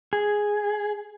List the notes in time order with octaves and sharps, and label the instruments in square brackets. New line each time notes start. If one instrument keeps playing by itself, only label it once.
[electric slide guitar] G#4